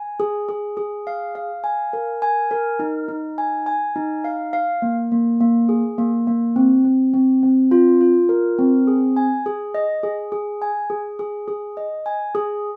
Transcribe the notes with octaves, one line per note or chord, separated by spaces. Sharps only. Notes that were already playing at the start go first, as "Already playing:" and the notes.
Already playing: G#5
G#4
G#4
G#4
F5
F5
G#5
A#4
G#5
A#4
D#4
D#4
G#5
G#5
D#4
F5
F5
A#3
A#3
A#3
G#4
A#3
A#3
C4
C4
C4
C4
F4
F4
A#4
C4
G#4
G#5
G#4
D#5
G#4
G#4
G#5
G#4
G#4
G#4
D#5
G#5
G#4